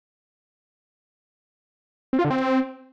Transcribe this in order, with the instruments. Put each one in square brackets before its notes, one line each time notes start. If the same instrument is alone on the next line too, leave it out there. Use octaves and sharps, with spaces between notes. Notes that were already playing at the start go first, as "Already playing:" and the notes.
[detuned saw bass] C4
F4
D3
C4